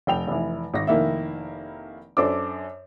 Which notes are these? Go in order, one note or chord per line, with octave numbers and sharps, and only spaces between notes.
F1 G5 F7
F1 E3
G#1 A#6
F1 D#3 A#3 E4 E5
F#2 D4 A4 C5 D5 D6